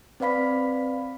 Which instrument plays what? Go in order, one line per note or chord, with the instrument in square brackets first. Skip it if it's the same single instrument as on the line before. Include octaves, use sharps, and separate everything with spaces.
[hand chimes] C4 B4 D5 F5 B5 B6